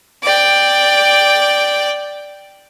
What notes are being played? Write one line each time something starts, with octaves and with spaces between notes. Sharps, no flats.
D5 G5